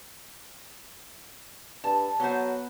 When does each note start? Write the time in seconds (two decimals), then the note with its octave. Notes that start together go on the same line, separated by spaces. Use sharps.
1.84 G2 A5
2.20 F#3 B3 C5